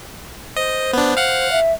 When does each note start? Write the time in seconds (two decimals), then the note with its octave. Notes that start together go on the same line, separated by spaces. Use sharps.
0.56 C5 D#5
0.93 B3 D4
1.17 F5 F#5
1.52 E5